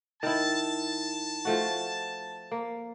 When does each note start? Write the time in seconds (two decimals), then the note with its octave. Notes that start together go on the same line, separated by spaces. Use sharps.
0.23 D#3 E4 A5
1.45 F3 A3 F#4
2.52 A#3